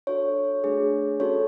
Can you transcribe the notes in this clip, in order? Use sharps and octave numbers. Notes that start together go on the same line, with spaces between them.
D4 F#4 A4 C#5
A3 D4 G#4
C#4 F#4 A4 C#5